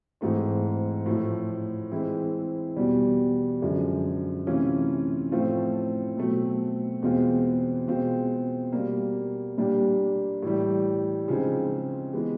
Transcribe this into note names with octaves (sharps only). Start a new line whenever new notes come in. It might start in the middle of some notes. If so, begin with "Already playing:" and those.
G#2 E3 A3 C4
A2 F3 A3
E3 G#3 C4 E4
E2 B2 G3
F#2 D3 F3 G#3
C3 E3 A3 C#4 F4
A2 F3 A3 C4 F4
B2 F#3 A3 C4
E2 B2 G#3 C4 F4
B2 G#3 C4 F4
B2 G3 A#3
A#2 G3 A#3 D4 G4
A2 E3 G3
C#3 F3 G#3 C4 D#4
E3 G#3 B3